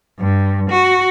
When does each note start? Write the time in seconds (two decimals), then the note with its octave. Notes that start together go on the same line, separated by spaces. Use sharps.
0.19 G2
0.70 F#4